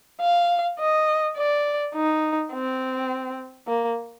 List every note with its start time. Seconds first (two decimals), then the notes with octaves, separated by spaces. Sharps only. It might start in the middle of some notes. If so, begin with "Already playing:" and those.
0.21 F5
0.79 D#5
1.37 D5
1.95 D#4
2.52 C4
3.67 A#3